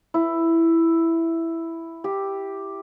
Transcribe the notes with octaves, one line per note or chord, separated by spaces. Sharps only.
E4
G4